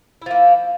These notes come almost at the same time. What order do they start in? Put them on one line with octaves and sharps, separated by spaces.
E4 F3 A#3